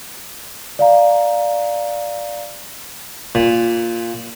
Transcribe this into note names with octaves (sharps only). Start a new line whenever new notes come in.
D5 F5 A#5
A#2